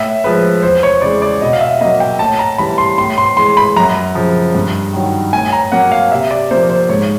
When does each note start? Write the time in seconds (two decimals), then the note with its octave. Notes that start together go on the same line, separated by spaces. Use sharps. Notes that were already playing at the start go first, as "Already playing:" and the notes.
Already playing: A2 E5
0.24 F3 G#3 B4
0.63 E2 C5
0.83 C#5
1.02 C#3 E3 G#3 D5
1.22 D5
1.41 B2 D#5
1.53 F5
1.61 E5
1.81 F#3 A#3 D#5
2.00 G5
2.19 A2 A5
2.39 A#5
2.58 E3 G3 B5
2.78 C6
2.98 A2 C6
3.18 C6
3.37 E3 G#3 C6
3.57 B5
3.76 F#2 A#5
4.15 C#3 F3
4.55 G2
4.93 D#3 F#3
5.33 A2 G#5
5.53 A#5
5.72 F#3 A#3 F#5
5.92 F5
6.11 C3 E5
6.31 D5
6.51 F3 A#3 C5
6.70 C5
6.89 G#2 C#5